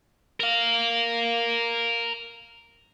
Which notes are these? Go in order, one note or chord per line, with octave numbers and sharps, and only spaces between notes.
A#4 F5